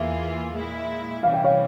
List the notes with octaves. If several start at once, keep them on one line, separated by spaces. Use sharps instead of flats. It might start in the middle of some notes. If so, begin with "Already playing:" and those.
Already playing: E2 E3 A#3 F4 G#4 E5
A#2 G#3 E4
C3 E3 G3 C#4 F5
G5
C#5 F5